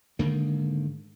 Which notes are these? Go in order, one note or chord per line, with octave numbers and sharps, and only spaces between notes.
G#2 D3 D#3 A#3